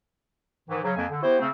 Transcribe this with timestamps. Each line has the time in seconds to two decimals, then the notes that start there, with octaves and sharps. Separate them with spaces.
0.69 G#2 D#3 E3
0.82 C#3 F#3
0.96 F2 A#3 G#5
1.10 D3
1.22 B3 E4 F#4 G4 C5
1.39 C#3 A3 C4